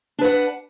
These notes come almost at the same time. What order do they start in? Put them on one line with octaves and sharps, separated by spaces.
D4 B4 F#5